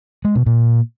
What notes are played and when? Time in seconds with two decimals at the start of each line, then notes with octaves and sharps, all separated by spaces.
0.25 G#3
0.35 B2
0.46 A#2